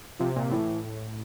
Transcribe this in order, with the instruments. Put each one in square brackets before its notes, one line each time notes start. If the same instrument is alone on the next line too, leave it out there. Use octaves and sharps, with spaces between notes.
[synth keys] C3 [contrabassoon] F3
[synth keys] A#2
[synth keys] A2 [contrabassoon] E3